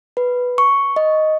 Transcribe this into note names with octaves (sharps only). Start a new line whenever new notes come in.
B4
C#6
D#5